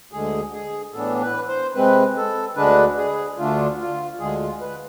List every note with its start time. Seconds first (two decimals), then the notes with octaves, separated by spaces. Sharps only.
0.12 D2 D3 G#3 G#4
0.53 G#4
0.93 A2 E3 B3 D4 A4
1.21 B4
1.48 C5
1.75 C3 G#3 C4 B4
2.17 A4
2.56 D2 D3 G#3 D4 B4
2.98 G#4
3.38 D2 D3 A3 D4 F4
3.79 F4
4.20 D2 D3 G#3 G#4
4.40 F4
4.61 B4